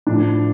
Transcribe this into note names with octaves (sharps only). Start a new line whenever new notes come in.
A2 F3 D4